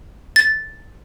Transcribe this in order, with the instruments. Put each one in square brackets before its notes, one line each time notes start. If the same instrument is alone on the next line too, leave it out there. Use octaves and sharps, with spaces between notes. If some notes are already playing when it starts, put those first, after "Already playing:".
[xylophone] A6